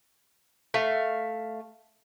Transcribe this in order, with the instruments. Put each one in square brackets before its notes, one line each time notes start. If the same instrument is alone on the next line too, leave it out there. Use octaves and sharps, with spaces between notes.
[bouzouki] A3 E5 F5